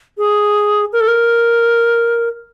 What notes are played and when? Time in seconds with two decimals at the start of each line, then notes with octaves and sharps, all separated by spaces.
0.18 G#4
0.93 A#4
1.01 A4
1.08 A#4